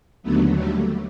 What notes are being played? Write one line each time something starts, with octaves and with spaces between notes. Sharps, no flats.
D#2 D3 F#3 A3 B3
G3 A3